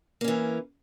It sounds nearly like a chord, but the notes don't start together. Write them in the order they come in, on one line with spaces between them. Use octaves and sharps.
A#3 C#4 E3